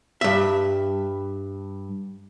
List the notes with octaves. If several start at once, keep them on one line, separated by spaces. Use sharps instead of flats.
G2 E5